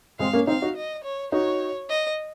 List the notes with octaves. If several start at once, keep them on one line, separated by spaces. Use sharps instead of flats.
G#3 C4 F5
A#3 C#4
C4 D#4 F5
D#4 F#4
D#5
C#5
D#4 F#4 C#5
D#5